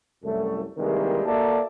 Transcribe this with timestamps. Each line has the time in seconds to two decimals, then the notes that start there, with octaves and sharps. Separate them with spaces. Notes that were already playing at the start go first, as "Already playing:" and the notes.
0.24 C2 F#2 A3
0.77 C3 D#3 E3 G3 G#3 A#3
1.26 A#3 F#4 A4 D5 E5 A5